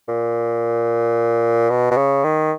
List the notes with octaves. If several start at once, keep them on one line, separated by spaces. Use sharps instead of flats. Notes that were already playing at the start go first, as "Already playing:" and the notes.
A#2
B2
B2
C#3
D#3